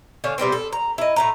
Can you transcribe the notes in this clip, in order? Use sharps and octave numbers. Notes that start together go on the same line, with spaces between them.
D3 C#4 F5
C3 G3 B3 C4
A4
A#5
E4 D#5
A2 A3 A#5